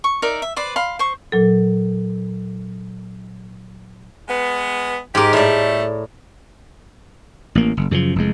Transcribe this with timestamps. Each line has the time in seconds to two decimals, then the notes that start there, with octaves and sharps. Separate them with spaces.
0.04 C#6
0.22 D#4 A#4 D5 E5
0.42 E5
0.56 B4 C5 D5
0.76 F5 B5 C6
0.99 C5 C#6
1.32 A#2 F#3 A4
4.28 G#3 B3
5.15 G#2 G4 A#4
5.33 A2 G3 A3 D5
7.55 A1 A#3
7.77 F#1
7.91 F#2 C#3 E3 F3
8.16 F1 E2 G#3